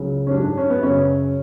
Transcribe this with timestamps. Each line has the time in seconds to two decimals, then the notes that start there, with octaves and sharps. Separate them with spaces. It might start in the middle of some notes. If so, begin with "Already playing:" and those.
Already playing: C#2 C#3 F#3
0.27 C#4
0.31 G#2 F#3 D4
0.44 D4
0.57 C#4
0.70 B3
0.82 F#2 C#3 F#3 C#4